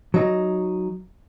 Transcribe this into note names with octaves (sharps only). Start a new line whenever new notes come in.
F#3 D#4